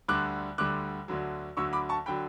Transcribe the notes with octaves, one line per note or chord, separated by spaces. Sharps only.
D2 D3 G3 D6 F#6
D2 D3 G3 D6 F#6
D2 D3 F#3
D2 D3 F#3 C#6 E6
B5 D6
A5 C#6
D3 F#3 G5 B5